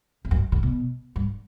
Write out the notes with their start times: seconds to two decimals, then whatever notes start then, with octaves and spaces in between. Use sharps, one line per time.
0.25 E2
0.31 F#2
0.52 D3
0.63 B2
1.16 G2